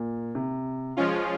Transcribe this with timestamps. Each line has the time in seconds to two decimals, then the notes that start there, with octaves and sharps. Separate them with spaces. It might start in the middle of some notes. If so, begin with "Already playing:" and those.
Already playing: A#2
0.35 C3
0.97 F3 G#3 C#4 F4